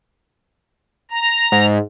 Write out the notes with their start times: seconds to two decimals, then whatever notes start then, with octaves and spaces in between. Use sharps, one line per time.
1.11 A#5
1.52 G#2